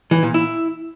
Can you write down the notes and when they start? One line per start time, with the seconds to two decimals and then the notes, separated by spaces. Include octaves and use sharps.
0.11 E3
0.23 A#2
0.34 E4